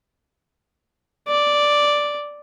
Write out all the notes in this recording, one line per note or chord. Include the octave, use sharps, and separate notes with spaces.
D5